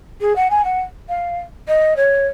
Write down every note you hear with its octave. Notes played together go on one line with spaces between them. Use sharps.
G#4
F#5
G#5
F#5
F5
D#5
C#5